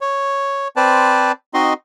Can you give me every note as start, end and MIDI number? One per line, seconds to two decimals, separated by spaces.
0.01 0.68 73
0.76 1.32 60
0.76 1.32 71
0.76 1.32 72
0.76 1.32 74
0.76 1.32 81
1.54 1.73 60
1.54 1.73 63
1.54 1.73 66
1.54 1.73 75
1.54 1.73 84